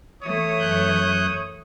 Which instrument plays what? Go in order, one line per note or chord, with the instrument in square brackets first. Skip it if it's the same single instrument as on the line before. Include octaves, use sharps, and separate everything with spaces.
[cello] E3 A3 [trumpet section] C#5 D#6
[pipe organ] F#2 F#6 G6